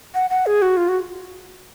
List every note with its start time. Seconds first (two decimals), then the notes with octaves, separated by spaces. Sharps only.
0.15 F#5
0.30 F#5
0.46 G#4
0.62 F#4
0.77 F4
0.89 F#4